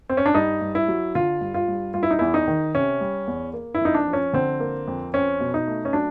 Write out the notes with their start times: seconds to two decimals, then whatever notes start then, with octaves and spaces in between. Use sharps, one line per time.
0.10 C4
0.17 C#4
0.26 D4
0.35 G2 D#4
0.61 G2
0.75 E4
0.88 F#3
1.15 D3 F4
1.41 G2
1.54 F4
1.68 G2
1.94 G3 F4
2.03 E4
2.11 D#4
2.19 E2 E4
2.34 D#4
2.48 D#3
2.74 C3 C#4
3.01 G3
3.27 E2
3.53 A#3
3.74 E4
3.81 F2 D#4
3.94 D4
4.07 F3
4.13 C#4
4.33 D3 C4
4.60 A#3
4.88 F2
5.14 C4 C#4
5.40 B2
5.54 D#4
5.67 A3
5.85 C#4
5.93 F#3 D4